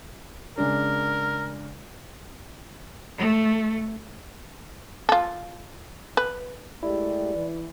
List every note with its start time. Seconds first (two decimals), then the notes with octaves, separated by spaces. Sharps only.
0.58 C#3 G#3 D4 A#4
3.18 A3
5.09 F4 A4
6.17 B4
6.83 G#3 A3 E4 G4 D5
7.35 E3